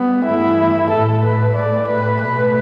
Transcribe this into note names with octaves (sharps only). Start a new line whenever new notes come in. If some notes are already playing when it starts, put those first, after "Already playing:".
Already playing: G3 B3
G2 E3 A3 E4
A2 A3 A4
B4
A2 A3 D5
B4
B2 A3 B4